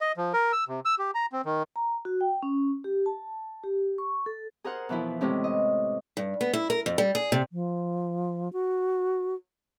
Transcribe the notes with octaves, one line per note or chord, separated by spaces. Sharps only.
D#5
F3
A#4
E6
C3
E6
G4
A#5
C4
D#3
A#5
F#4
G5
C#4
G4
A5
G4
C#6
A4
G#4 A#4 C5 F#5
B2 E3 F3 E4
A2 C3 G#3 C4 C#4 E4
D#5
G2
B3
E4
A#4
F2
G3
G#4
C3
F3
F#4